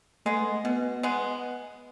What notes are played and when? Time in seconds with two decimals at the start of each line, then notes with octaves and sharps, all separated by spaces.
0.26 G#3 A3 B3
0.65 B2 B3
1.03 G#3 B3